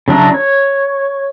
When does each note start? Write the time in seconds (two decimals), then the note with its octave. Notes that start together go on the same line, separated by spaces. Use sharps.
0.08 C#3 F#3 D4 E4 A#5
0.34 C#5